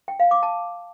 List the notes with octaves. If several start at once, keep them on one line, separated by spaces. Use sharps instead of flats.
G5
F5
D6
A5